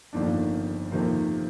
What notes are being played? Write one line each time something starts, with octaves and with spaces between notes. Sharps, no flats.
G1 F2 D#3 A#3 D4
F2 C3 D#3 A#3